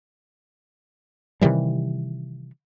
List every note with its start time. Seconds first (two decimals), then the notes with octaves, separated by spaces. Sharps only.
1.41 C3 D#3 E3 G3